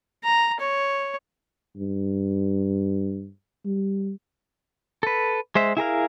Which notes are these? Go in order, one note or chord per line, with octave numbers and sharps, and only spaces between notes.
A#5
C#5
G2
G3
A4 B4
G#3 C5 E5
E4 G#4 A#4 F5